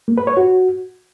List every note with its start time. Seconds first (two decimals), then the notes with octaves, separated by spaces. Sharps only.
0.08 A#3
0.18 B4
0.27 C#5
0.37 F#4